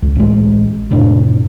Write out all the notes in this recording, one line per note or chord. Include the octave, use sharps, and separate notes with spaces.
C#2
A1 G#3
F1 A2 C3 D4